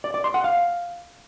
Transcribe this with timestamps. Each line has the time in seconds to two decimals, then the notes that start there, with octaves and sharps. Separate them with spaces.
0.04 D5
0.14 D5
0.24 C6
0.34 F#5
0.44 F5